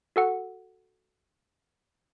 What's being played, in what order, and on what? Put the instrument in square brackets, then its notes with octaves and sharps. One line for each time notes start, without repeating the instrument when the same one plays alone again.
[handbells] F#4 A4 F#5